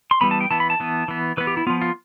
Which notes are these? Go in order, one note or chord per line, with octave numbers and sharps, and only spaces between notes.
C6
E3 G3 B3 B5
A5
G5
E3 B3 A5
B5
A5
E3 B3
E3 B3
E3 B3 B4
G4
E4
F3 B3 F4
F4